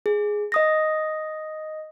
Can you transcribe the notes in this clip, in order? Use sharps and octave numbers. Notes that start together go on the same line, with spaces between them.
G#4
D#5 D#6 A#6